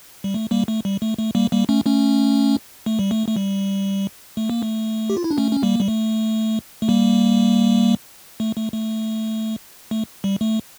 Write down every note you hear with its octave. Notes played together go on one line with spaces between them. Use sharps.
G3
A3
G3 A#3
A3
G3
A3
A3
G3 A#3
G3 A#3
A3 C#4
A3 C#4
A3
G3
A3
A3
G3
A3
A#3
A3
G4
F4
E4
D4
A3 C#4
C#4
G3 A#3
G3
A3
A3
G3 A#3
A3
A3
A3
A3
G3
A3